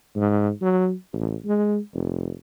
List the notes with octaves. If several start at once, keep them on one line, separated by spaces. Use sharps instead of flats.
G#2
F#3
A1
G#3
F1